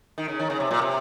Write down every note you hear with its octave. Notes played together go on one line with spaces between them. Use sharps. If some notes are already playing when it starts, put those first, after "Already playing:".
D#3
C#3
D#3
C#3
C3
A#2
C3